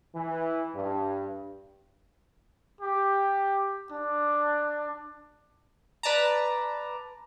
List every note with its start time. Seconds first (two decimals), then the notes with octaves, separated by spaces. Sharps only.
0.15 E3
0.75 G2
2.81 G4
3.91 D4
6.03 B4 D5 A5 A#5